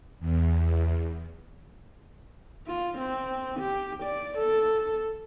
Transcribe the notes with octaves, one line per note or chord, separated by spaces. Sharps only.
E2
F4
C4
G4
D5
A4